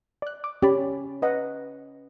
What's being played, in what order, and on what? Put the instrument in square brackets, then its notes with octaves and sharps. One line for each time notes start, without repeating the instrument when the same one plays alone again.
[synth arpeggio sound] D5 F#6
D6
[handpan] C#4 [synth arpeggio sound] G4 D5 B5 [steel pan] C#5
[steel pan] B4 D#5 F#5